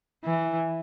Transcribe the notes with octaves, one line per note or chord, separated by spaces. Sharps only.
E3